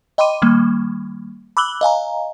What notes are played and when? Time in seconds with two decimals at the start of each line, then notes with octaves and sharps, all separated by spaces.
0.18 D#5 G5 B5 C6 D6 D#7
0.42 D#3 G3 A#3
1.57 B5 D6 E6 F#6 F#7 G7
1.81 D#5 F5 G#5 A#5